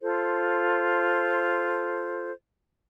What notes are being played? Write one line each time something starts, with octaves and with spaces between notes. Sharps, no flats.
F4 A4 C5